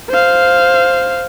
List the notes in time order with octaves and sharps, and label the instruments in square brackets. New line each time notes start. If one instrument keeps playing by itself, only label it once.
[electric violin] C5 F5